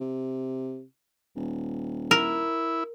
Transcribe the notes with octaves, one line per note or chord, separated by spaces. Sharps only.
C3
D#1
E4 A#4